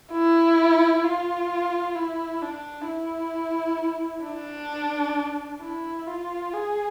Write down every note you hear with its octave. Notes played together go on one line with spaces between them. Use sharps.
E4
F4
E4
D4
E4
D4
E4
F4
G#4